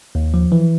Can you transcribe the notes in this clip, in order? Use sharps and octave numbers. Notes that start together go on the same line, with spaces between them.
D#2
F3
E3